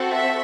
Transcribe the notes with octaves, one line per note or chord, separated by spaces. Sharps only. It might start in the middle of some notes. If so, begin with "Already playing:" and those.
Already playing: C4 F#4 A4
E5